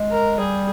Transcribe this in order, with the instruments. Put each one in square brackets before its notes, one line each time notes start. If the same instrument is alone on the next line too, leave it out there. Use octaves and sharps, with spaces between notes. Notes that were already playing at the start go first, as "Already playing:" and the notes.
Already playing: [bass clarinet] G#3
[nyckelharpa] A#4
[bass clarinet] G3 [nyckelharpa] G#4